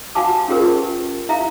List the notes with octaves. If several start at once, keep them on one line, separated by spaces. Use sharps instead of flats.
F#4 F5 F#5 G#5 A5 D6
C#4 F4 G4 G#4 A#4 B4
E4 E5 F5 A#5